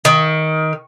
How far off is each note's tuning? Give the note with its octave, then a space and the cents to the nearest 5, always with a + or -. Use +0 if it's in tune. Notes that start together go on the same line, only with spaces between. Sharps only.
D#3 +15